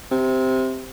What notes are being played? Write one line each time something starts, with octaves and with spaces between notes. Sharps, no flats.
C3